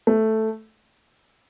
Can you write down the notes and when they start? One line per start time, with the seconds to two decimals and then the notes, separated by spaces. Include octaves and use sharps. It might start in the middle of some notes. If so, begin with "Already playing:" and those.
0.07 A3